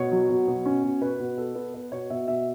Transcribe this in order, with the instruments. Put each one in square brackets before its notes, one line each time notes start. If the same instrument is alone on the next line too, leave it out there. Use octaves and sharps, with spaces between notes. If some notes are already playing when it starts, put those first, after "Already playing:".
Already playing: [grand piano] B2 C#5
F#3
B2
B2
C#4
B2
B2 B4
B2
B3 A4
B3
B3 B4
B2 C#5
B2 E5
B2 E5